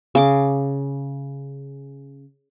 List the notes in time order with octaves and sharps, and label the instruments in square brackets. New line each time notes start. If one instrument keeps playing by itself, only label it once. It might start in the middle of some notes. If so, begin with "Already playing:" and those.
[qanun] C#3 D6